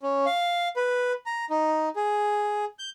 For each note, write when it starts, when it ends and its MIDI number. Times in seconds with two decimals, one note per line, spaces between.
0.03 0.26 61
0.26 0.68 77
0.76 1.13 71
1.26 1.45 82
1.50 1.89 63
1.96 2.65 68
2.79 2.90 91